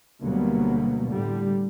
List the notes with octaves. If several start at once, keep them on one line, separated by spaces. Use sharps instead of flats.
D2 B2 F#3 G3 A#3 B3
A2 D3 G3